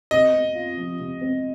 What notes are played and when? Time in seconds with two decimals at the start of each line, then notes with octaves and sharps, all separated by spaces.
0.11 C3 D#5
0.33 C4
0.55 F4
0.77 F3
1.00 C3
1.21 C4